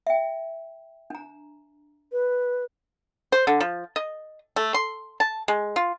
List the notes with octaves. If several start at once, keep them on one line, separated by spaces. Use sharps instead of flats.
E5 G5
D4 A#5
B4
C5
D3
F3
D#5
A3
C6
A5
G#3
F4